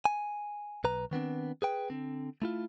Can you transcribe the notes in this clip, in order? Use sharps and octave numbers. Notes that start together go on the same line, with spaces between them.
G#5
B1 B4 A#5
D#3 B3 C4 D4
G#4 B4 G5
D3 C4
A3 E4 F4